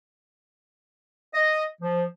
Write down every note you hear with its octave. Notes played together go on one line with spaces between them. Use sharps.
D#5
F3